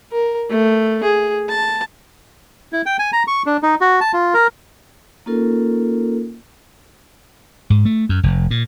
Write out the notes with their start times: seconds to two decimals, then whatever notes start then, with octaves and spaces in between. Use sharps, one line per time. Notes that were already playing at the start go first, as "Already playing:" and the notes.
0.12 A#4
0.50 A3
1.03 G#4
1.49 A5
2.73 E4
2.86 G5
2.99 G#5
3.13 A#5
3.27 C#6
3.46 D4
3.63 D#4
3.81 F#4
4.01 A5
4.13 F4
4.34 A#4
5.26 A#3 C#4 D#4 F4 A4 A#4
7.70 G#2
7.85 A3
8.09 F#2
8.23 F1
8.51 A#2